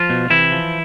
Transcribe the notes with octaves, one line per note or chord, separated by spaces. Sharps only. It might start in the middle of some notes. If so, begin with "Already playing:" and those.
Already playing: F3 F4
B2
C3 E3 E4
F3